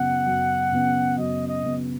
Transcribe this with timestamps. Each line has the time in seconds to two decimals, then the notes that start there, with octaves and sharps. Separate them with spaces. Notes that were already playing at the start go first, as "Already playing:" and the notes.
Already playing: F#2 C#3 B3 F#5
0.26 F#2
0.72 C#3 B3
1.18 F#2 D#5
1.48 D#5
1.64 C#3 B3